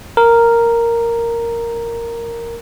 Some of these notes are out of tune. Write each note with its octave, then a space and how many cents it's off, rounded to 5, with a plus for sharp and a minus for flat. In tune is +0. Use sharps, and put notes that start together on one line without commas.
A#4 -5